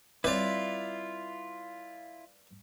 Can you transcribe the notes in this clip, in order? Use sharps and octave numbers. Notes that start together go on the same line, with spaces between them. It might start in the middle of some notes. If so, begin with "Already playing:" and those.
G3 C4 E4 F4 B4 C#5 D5